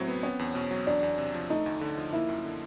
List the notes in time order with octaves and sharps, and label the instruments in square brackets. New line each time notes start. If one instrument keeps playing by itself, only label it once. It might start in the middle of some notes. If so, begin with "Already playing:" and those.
Already playing: [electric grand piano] A2 F#3 E4 [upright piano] C4 C5
[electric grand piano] B3
[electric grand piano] B3 [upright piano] C#4 C#5
[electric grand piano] E2
B2
F#3
[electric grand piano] E2 [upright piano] D4 D5
[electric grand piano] E2
C3
F3
[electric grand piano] A3 [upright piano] D#4 D#5
[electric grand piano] D2
D3
F3
[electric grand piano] A#3 [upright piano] E4 E5
[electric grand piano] F#2
D3